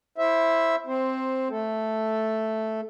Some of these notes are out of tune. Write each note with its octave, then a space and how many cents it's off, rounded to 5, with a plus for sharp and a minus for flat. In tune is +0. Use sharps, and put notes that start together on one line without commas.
E4 +0 C5 +15 E5 +0
C4 +0 C5 +10
A3 +0 A4 +0